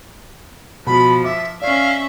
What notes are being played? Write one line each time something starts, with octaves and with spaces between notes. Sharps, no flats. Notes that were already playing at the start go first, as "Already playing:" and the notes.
B2 F3 B5
E5 D6
C#4 D5 E5 F5